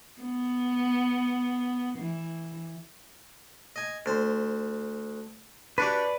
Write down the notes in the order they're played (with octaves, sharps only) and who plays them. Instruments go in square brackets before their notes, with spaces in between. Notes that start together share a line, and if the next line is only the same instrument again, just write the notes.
[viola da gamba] B3
E3
[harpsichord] D#5 G#5
D2 C5
[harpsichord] D4 F#4 G4 [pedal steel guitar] B4 D5